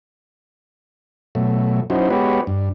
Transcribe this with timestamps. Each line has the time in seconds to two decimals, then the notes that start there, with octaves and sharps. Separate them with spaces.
1.35 B2 F#3 A3
1.90 F#3 C#4 D#4 E4 F#4 C5
2.10 G#3 B3 F#4 G4 B4 C#5
2.47 G2